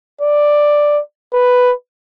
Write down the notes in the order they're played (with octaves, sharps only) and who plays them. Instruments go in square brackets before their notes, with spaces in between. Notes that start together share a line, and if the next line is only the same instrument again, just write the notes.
[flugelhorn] D5
B4